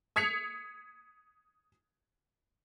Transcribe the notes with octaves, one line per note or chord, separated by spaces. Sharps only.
D#6 G#6 B6 C#7 F7